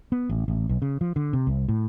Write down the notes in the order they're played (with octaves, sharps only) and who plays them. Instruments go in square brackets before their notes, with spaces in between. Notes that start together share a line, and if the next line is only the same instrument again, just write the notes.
[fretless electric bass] B3
A1
A1
B1
C#3
F3
D3
C3
C2
A2